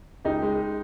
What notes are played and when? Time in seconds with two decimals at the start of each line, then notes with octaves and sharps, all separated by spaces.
0.25 C#2 D#4 G4
0.42 G#3